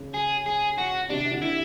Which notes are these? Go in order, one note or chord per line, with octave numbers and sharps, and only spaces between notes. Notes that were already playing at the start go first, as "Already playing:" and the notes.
Already playing: C#3
G#4
G#4
F#4
C3 D4
D3
E4